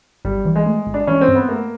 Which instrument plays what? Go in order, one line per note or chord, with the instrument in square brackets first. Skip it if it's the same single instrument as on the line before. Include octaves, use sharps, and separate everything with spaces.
[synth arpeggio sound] G1 [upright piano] G3
[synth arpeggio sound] E3
[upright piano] G#3
[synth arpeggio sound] A3
G1
[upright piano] D4
[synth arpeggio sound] E3 [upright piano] C#4
[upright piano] C4
[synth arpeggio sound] G2
[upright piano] B3
[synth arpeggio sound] A3 [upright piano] A#3